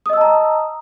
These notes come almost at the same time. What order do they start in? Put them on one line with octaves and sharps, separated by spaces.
D#6 D#5 E6 A5 A#5